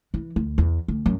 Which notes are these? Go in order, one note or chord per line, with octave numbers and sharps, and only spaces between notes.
E3
D2
E2
D2
F#2